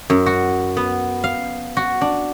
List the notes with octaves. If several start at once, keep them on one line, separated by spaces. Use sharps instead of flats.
F#2
F#4
B3
F5
F#4
D4